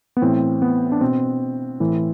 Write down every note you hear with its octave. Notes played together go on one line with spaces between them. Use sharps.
B3
A2 E3 C4
B3
D4
B2 C4
A2 E3